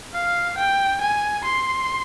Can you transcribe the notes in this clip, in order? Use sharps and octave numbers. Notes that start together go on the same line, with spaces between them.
F5
G5
G#5
C6